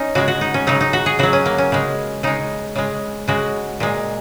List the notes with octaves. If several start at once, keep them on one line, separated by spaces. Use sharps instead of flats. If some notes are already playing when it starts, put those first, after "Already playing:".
Already playing: C#4 D#4
C#3 G#3 F#4
F#4
D#4
C#4
C#3 F#3 D#4
D#4
F#4
G#4
C#3 F#3 F#4
C#4
A#3
C#4
C#3 G#3
C#3 G#3 D#4
C#3 G#3
C#3 G#3 F#4
A#2 G#3